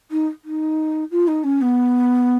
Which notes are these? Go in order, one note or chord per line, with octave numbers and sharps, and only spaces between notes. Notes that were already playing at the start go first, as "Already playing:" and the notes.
D#4
D#4
F4
D#4
C#4
B3